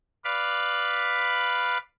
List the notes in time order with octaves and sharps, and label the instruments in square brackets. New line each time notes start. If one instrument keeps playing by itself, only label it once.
[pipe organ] B4 D5 F5 B5